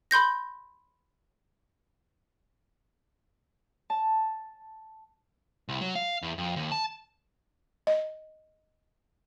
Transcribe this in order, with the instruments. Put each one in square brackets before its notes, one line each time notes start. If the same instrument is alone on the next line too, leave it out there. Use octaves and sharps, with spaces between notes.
[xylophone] B5 C6 G6 A#6
[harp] A5
[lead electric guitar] C2
F#3
F5
E2
F2
D#2
A5
[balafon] D#5